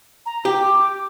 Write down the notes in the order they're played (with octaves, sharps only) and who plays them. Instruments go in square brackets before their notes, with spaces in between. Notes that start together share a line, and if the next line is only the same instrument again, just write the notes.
[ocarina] A#5
[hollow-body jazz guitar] G4
[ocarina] D6